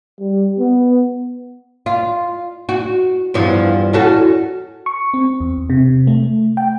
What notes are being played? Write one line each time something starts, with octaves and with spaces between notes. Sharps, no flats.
G3
B3
F4
F#4
E2 G2 F3
C#4 F#4 A4
C#6
C4
E2
C3
A3
G5